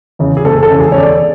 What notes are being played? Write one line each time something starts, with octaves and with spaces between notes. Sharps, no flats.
E2 C#3
G#4
F#1 A4
A4
E2 C#3
G#4
C#5
G1 D5